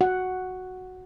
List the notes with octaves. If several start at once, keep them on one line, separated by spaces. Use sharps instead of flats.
F#4 F#5